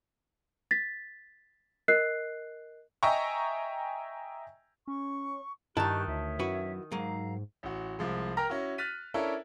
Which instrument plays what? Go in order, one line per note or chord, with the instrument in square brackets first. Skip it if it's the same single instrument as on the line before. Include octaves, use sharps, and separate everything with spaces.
[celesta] A6 B6
A#4 D#5 F#6 C7
[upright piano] D#5 E5 G5 G#5 A#5 C#6
[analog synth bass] C#4 [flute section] C#6
[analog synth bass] G2 [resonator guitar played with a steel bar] D#3 A5 [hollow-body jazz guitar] E4 A#5 [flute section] G4 C#6 F#6
[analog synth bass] D2 [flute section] C#5 E5
[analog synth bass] F#2 [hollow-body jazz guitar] E4 F#4 B4
[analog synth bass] G#2 [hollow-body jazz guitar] F#3 A#3 [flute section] F5 A#5
[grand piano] A1 F#4
C2 F3 G#3
A#4 G5 A#5 F6 A#6
C#4 E4 F#4
F6 F#6 A6 B6 D#7
C#4 D4 E4 A4 A#4